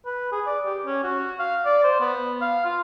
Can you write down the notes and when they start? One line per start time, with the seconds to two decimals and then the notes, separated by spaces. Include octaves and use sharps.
0.06 B4
0.32 G#4
0.47 D5
0.66 G4
0.85 C#4
1.04 F#4
1.39 F5
1.66 D5
1.84 C5
2.00 B3
2.41 F5
2.65 F4